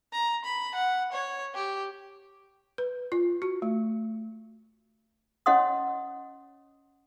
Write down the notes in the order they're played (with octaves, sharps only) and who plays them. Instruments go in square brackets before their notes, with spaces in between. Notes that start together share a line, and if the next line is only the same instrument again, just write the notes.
[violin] A#5
B5
F#5
C#5
G4
[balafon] B4
F4
F#4
A3
[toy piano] C#4 C#5 D#5 F#5 C6 D#6